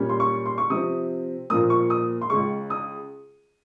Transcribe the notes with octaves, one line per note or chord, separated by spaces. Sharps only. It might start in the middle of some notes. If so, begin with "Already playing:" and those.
Already playing: A#2 G3 C#4
C6
C#6
C6
C#6
C3 F3 C4 D#6
A#2 F3 A#3 D#6
C#6
D#6
C6
C#2 C#3 G#3 C#6
D#6